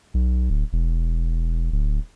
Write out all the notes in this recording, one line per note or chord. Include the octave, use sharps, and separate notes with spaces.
B1
D1
E1
D1